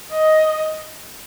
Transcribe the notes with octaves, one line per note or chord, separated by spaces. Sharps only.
D#5